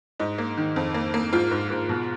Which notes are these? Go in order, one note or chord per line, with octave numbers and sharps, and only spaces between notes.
G#2 D#4
A#3
D#3
F2
A#3
A#3
G#2 F4
G#2
G#2
B2